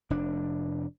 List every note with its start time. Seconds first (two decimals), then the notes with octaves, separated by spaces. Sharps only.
0.10 F1 D4